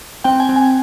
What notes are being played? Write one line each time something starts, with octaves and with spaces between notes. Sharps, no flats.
C4 G5
G#5
C4
G#5